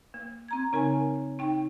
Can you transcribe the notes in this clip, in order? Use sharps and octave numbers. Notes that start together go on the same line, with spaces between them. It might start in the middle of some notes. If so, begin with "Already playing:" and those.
A#3
C4 A#5 G#6
C#3 D#4 A#4 G#5
D#4 G5